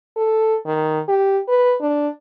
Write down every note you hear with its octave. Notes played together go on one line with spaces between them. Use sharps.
A4
D#3
G4
B4
D4